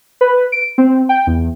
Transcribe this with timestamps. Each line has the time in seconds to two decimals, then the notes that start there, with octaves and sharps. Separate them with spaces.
0.21 B4
0.52 D7
0.78 C4
1.09 G5
1.27 E2